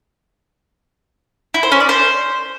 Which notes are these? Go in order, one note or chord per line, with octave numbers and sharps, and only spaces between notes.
E4
C5
C#4
D5
C5